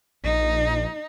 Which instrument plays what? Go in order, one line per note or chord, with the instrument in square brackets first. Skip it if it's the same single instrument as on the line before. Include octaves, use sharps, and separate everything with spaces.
[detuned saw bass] A#1 [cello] D#4